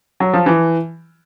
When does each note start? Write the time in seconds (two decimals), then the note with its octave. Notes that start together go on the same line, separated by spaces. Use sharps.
0.20 F#3
0.34 F3
0.46 E3